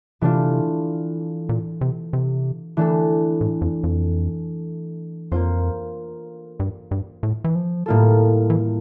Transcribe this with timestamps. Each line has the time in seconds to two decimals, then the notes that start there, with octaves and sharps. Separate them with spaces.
0.21 C3 E3 A3 D4 F4
1.49 A#2
1.81 C3
2.13 C3
2.77 E3 A3 D4 A4
3.41 A2
3.62 F2
3.84 F2
5.32 F2 A#3 F4 C5
6.60 G2
6.91 G2
7.23 A2
7.44 E3
7.55 F3
7.86 A2 G3 A#3 F4 A4
8.50 E3